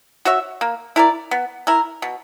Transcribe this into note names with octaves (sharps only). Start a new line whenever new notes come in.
F#4 C#5 E5
A#3
E4 A#4 D5
B3
E4 A#4
B2